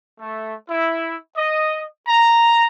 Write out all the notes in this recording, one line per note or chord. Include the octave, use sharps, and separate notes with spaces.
A3
E4
D#5
A#5